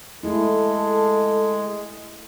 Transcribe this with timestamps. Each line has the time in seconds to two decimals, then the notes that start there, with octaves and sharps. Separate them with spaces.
0.23 G#3 A3 E4 A4